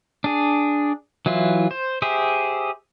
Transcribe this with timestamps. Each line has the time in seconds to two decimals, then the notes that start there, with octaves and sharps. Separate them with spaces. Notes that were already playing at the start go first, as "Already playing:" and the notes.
0.24 D4 G#4
1.26 E3 F#3 E4 F4
1.71 C5
2.02 G4 G#4 C5 E5